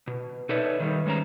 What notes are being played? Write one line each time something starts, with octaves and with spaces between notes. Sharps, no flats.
B2
D#4 A4 B4 C#5 D5 E5
D#3 G3
G2 G#3 C#4 C5 A#5